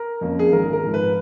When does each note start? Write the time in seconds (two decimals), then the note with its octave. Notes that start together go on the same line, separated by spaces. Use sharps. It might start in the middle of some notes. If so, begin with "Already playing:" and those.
Already playing: A#4
0.21 F2 F3 A#3 C#4
0.39 G#4
0.52 G#1 A#4
0.73 A#4
0.84 G#2 F3
0.94 B4